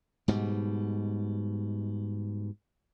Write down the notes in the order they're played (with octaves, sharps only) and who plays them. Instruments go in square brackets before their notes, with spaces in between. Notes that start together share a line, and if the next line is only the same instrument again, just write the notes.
[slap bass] G#2 B2 G3